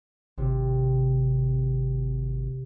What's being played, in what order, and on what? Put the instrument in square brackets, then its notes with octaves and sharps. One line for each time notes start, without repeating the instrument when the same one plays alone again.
[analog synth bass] G#1 [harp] C3